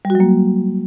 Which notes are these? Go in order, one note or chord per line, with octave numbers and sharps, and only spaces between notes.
G3
F#4
F#3
A#3